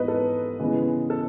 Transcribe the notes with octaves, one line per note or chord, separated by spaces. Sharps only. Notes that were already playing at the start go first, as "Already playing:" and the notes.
Already playing: G#2 E3 B3 B4 D#5
A4
C#3 E3 G#3 B3
A4